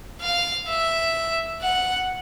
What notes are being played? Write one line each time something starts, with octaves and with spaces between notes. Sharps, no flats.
F5
E5
F#5